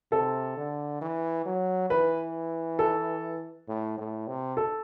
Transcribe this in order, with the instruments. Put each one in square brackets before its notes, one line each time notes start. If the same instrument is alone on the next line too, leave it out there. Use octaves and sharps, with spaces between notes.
[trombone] C3 [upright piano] A4
[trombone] D3
E3
F#3
[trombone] E3 [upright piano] B4
[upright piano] A4
[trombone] A2
A2
C3
[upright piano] A4